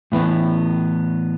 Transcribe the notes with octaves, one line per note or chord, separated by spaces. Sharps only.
A2 E3 B3